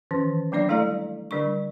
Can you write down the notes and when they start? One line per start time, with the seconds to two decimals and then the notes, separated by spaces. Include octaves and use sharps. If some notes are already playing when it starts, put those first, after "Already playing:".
0.11 D#3 E3 C#4
0.52 F#3 A#3 D4 D5 E5
0.69 G3 A3 E4 A4 F5 A#5
1.31 D3 G3 D4 C#6